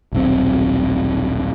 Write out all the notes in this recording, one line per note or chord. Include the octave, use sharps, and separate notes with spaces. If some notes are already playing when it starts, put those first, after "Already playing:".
D#1 B1 C4